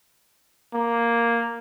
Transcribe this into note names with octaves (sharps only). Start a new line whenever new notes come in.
A#3